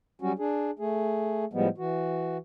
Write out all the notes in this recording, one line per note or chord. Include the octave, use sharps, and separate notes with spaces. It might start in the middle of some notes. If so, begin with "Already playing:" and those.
F#3 G3 C#4 F#4
D4 G#4
A3 G#4
A2 F3 G3 G#3 B3
E3 F#4